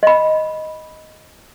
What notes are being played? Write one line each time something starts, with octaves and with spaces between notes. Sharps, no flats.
D#5 B5